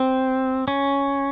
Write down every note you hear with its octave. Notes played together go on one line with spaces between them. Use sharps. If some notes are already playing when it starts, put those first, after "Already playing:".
Already playing: C4
C#4